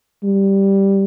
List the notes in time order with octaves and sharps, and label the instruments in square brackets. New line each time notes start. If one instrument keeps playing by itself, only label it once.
[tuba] G3